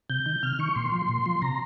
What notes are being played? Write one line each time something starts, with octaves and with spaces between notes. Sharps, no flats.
C3 G6
D#3
C3 F6
D#3 C#6
A#2 C6
F3
A#2
F3
C3 A#5